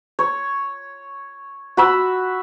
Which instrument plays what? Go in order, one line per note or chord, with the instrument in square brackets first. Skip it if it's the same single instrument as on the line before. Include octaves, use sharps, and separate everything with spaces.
[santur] C#5
F#4 B5 E6